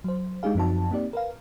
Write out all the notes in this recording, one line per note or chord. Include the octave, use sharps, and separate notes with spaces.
F#3 C5
G#3 D4 D#4 G4 G#4 F5
F#2 F3 C4 D#4 F#4 A5
A#3 C4 D#4 G4 D5
A#4 B4 F5